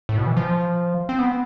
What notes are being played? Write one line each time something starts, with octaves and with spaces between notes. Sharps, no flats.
A2
B2
E3
F3
C4
B3